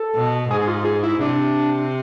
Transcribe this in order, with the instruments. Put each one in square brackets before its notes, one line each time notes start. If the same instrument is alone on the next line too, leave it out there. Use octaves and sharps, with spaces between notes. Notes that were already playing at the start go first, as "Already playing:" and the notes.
Already playing: [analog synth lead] A4
[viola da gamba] B2
[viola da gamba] G#2 [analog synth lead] G#4
[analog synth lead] G#4
F4
G#4
E4
[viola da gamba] C3 [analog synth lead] D4